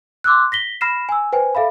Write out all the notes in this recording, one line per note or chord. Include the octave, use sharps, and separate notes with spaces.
C6 D6 E6 F#6
A#6 B6 G7
B5 F6 A#6 C7 E7
G#5 E6
B4 C5 G5 G#5
A4 E5 F5 B5